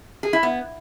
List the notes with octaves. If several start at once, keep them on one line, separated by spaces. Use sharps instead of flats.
G#4
E4
B3